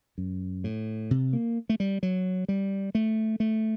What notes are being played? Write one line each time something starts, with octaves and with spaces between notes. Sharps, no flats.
F#2
A2
C3
A#3
A3
G3
F#3
G3
A3
A3